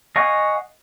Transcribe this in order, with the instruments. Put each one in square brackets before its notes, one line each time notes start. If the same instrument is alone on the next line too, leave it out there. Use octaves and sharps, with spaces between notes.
[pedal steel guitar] D#5 F5 F#5 G#5 C#6